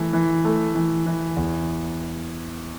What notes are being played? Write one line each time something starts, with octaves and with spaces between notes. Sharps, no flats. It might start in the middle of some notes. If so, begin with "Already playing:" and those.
Already playing: E3 A3
E3
A3
E3
E3
E2